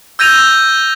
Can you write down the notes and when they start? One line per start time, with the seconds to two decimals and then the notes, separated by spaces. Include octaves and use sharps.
0.19 E6 G6 G#6 A#6 D#7 F7